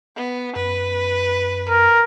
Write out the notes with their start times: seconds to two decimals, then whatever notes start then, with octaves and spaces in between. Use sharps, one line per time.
0.16 B3
0.56 F#2 B4
1.69 A#4